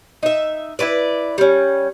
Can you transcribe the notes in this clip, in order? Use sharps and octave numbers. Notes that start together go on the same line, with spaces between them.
D#4 E5
E4 F4 B4 D5
G3 C#4